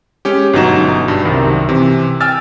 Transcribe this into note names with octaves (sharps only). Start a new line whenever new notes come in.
G#3 C#4 G4
G1 B2 F#3 D#4 A#5 E7
G2
C2 F#2 C3 D#3
C3 E3
G5 G#5 E6 F6 A6